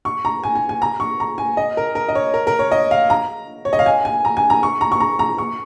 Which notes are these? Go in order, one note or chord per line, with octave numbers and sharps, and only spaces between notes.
C#6
A#5
G#5
G#5
G#5
A#5
C#6
A#5
G#5
D#5
A#4
A#4
D#5
C#5
A#4
A#4
C#5
D#5
F5
A#5
C#5
D#5
F5
G#5
G#5
A#5
G#5
A#5
C#6
A#5
C#6
A#5
A#5
C#6